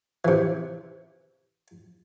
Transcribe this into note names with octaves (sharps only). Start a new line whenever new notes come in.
C3 E3